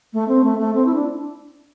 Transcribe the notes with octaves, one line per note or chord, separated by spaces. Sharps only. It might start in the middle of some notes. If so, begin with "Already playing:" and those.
A3
C4
A3
A3
C4
E4
D4